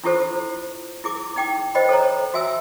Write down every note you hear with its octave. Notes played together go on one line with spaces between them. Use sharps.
D4 E4 F4 G4 A4 C5
E4 G#4 D6
D#4 G5 D6
C5 D#5 G5 B5
A4 C5 C#5 A#5
F#4 E5 G#5 E6